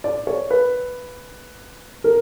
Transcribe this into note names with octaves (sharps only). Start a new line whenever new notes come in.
D5
C#5
B4
A#4